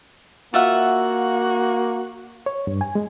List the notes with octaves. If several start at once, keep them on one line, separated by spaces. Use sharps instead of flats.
A#3 F4 F#4 E5 F#5
C#5
G2
G#5
G#3